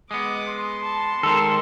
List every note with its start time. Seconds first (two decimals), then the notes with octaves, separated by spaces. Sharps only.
0.11 G#3 B3 D6 D#6
0.47 C6
0.82 A5
1.23 D#3 G#3 A4 A#4 C5